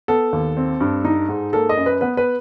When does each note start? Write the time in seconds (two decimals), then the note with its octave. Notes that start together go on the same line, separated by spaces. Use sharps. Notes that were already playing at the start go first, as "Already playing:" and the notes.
0.08 B3 A4
0.33 D#2
0.57 C4
0.80 G2
1.05 D#4
1.29 G#2
1.53 A#3 A4
1.69 D#5
1.77 F#2
1.86 B4
2.01 B3 B4
2.17 B4